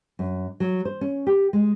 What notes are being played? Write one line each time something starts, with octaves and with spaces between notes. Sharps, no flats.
F#2
F#3
C5
C#4
G4
G#3